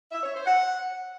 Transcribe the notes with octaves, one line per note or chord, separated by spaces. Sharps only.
E5
C#5
C5
F#5